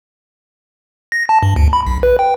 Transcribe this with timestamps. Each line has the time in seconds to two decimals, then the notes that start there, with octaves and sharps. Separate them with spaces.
1.12 A#6
1.29 A5
1.43 G2
1.56 D2
1.73 B5
1.86 B1
2.03 B4
2.19 G5